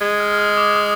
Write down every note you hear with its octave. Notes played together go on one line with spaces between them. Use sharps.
G#3 G#6
F6
F6
D#6
D#6
D6
F6
D#6